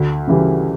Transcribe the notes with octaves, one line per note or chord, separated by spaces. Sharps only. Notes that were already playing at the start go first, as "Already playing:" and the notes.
Already playing: D2
C#3 E3 G3